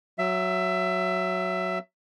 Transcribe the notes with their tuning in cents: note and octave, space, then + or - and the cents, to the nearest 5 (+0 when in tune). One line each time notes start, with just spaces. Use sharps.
F#3 +0 E5 +20